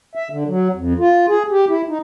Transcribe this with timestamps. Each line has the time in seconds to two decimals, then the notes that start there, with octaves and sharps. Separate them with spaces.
0.15 E5
0.31 D3
0.47 F#3
0.74 F2
0.99 F4
1.28 G#4
1.51 G4
1.69 E4
1.89 D#4